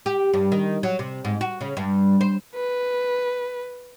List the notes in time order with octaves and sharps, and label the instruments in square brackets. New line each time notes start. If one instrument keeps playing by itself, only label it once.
[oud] G4
G2
D#3
F#3
C3
G#2
F#4
C#3
G2
C5
[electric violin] B4